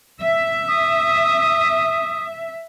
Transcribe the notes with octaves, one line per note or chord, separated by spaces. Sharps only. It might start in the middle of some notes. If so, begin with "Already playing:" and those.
E5
D#6